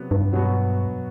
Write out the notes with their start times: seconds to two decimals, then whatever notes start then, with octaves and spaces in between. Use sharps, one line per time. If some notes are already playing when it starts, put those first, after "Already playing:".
Already playing: C3 F#3 B3
0.11 G2
0.33 B2 F#3 B3 F#4